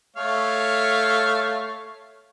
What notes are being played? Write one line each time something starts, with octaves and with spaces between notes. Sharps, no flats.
A3 C#5 F5